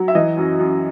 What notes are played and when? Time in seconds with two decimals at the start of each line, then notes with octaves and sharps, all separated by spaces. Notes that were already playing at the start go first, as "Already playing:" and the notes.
Already playing: F#3
0.08 E5
0.15 E3 D#5
0.37 F#2
0.59 F#2